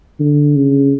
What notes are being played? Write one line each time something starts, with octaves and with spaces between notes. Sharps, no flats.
D3
C#3